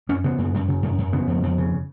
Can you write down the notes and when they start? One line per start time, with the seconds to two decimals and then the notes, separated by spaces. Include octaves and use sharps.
0.09 F#2 C#4
0.24 C#3 B3
0.38 F#2
0.54 F#2
0.68 C#3
0.83 F#2
0.98 F#2
1.13 C#3 B3
1.27 F2
1.43 F2
1.58 C#3